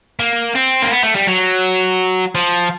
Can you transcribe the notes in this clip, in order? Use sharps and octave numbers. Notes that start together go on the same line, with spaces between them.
A#3
C4
A#3
B3
A3
G3
F#3
F3